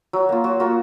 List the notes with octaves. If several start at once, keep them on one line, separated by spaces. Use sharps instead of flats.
F#3
A#3 F4
F#3 F#4
A#3 F4 F#4